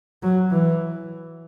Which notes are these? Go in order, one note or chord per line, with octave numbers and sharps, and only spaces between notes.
F#3
E3